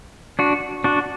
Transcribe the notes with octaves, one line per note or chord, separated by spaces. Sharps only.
D4 F#4
D4 F#4